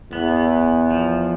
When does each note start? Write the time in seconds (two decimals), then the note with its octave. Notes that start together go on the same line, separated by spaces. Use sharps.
0.12 E2 B3
0.91 F3